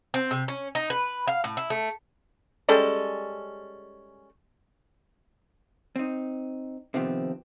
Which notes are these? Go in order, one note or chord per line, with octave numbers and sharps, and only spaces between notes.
C4
C3
C#4
D#4
B4
F5
A2
E4
A3
G3 G#3 C#4 A4
C4 D#4
C3 D#3 F3 B3 C4